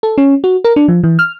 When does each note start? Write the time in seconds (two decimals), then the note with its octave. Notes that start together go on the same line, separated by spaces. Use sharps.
0.03 A4
0.18 C#4
0.44 F#4
0.64 A#4
0.76 D4
0.88 F3
1.04 E3
1.19 F6